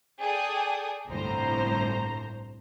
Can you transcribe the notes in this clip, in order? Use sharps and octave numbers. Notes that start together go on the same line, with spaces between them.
G#4 A4 D5 G5 G#5 D#6
G1 C2 A2 C5 A#5